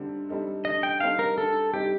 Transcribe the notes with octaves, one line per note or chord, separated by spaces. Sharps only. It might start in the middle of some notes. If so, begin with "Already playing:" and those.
Already playing: D3 G3 C4 D#4 A4
G3 C4 D#4 A4
D3 D#5
G5
G3 C4 D#4 A4 F5
A#4
D3 A4
G3 C4 D#4 G4 A4